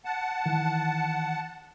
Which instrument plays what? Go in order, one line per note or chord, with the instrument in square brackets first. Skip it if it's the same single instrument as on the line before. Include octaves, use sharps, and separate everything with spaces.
[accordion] F#5 A5
[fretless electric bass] D#3 E3